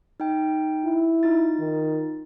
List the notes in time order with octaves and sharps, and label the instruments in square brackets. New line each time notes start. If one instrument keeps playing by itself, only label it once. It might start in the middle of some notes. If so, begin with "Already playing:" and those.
[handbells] D#4 G5
[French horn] E4
[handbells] D#4 F4 A6
[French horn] D#3